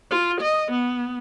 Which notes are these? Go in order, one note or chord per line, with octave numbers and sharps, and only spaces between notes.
F4
D#5
B3